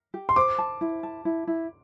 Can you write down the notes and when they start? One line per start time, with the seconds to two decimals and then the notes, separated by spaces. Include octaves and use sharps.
0.14 G4
0.29 C6
0.36 C5 D6
0.58 A5
0.81 E4
1.03 A5
1.25 E4
1.47 E4